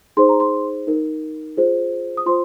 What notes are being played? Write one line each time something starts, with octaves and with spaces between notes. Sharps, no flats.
D#4 G#4 C5 C6
A#5
C6
D#4 A#4
F4 G#4 C5
D#6
F4 C5 C6